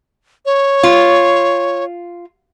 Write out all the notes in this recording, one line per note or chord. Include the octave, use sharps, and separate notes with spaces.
C#5
F4